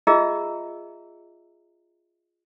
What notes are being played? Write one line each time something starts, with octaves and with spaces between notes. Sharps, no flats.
F4 G#4 D#5 E5 A#5 E6